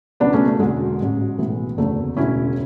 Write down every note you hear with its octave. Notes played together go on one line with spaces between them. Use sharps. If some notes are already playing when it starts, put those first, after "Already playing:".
C#2 B2 F#3 B3 D4
A3 C#4
A3
E1 D2 D3 F#3 G#3
A1 G#2 F#3
B1 A2 E3
F#1 E2 D3 F#3 A3
E1 D2 C#3 C#4 E4